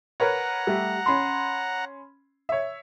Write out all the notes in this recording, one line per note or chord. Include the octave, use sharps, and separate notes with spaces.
A#4 B4 C#5 F#5 A#5
G3 A3
C#4 B5 C6
C#5 E5